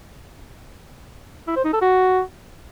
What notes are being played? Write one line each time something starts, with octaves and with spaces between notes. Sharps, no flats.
E4
C5
D#4
A4
F#4